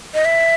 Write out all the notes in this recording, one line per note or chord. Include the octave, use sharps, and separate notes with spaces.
D#5
E5